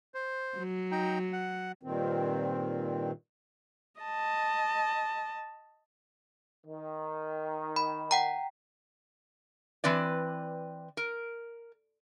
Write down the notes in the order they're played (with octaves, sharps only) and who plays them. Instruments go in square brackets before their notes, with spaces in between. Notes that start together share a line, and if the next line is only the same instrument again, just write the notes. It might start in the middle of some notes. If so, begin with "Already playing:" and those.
[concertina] C5
[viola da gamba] F#3
[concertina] D#4 G5 A#5
F#5
[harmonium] G2 A#2 D#3 C4
[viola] D#5 A5
[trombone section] D#3
[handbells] B5
F#5 G5 A#5
[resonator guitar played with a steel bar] E3 C4 B4 D5
A#4